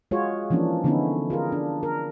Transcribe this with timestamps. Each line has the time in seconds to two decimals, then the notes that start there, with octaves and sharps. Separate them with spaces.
0.11 G#3 F4 F#4 G#4 C#5
0.50 E3 F3 A#3 C#4 D4
0.84 D3 E3 B3 C#4 D#4 E4
1.30 F4 G#4 A#4
1.52 D4
1.83 A#4